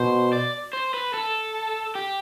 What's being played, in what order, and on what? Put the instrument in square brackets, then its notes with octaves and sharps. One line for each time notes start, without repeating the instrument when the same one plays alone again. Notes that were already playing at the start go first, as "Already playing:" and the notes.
Already playing: [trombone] B2 [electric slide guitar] C5
[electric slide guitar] D5
C5
B4
A4
G4